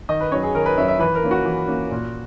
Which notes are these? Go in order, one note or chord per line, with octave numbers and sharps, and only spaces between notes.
D#3 D#5
B4
F#3 C#4 C#5
G#4
D#3 A#4
B4
F#3 C#4 E5
E5
E3 B4
A#4
A#3 C#4
F#4
E3
A#3 C#4
A#2